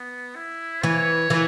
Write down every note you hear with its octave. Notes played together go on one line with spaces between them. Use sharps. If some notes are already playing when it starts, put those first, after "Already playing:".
Already playing: B3
E4
E3 C#5
E3